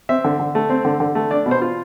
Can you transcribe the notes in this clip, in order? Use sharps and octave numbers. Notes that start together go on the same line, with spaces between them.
C4 E5
D3
D3
A3
C4
D3
D3
A3
D4 D5
B2
C5
F4